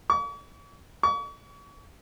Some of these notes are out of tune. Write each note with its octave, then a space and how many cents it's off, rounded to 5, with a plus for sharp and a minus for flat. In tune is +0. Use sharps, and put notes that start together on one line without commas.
C#6 +45
C#6 +40